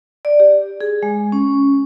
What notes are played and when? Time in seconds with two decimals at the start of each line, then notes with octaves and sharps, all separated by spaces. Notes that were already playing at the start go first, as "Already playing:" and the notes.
0.25 D5
0.40 G4
0.81 G#4
1.03 G#3
1.32 C#4